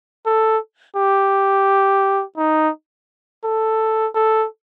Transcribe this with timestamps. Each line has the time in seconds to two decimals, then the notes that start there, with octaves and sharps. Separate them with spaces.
0.26 A4
0.96 G4
2.38 D#4
3.44 A4
4.15 A4